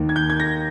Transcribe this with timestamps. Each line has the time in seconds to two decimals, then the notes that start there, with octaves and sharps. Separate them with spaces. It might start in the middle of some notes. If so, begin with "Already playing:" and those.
Already playing: D#2 D#3 A#3
0.09 G#6
0.16 G6
0.30 G#6
0.40 A#6